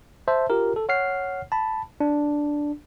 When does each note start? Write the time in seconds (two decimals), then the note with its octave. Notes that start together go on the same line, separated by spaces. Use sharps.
0.28 C5 E5 A5
0.50 F4 G4 A#4
0.76 A4
0.89 C#5 F#5 F6 C7
1.52 A5 B5
2.00 D4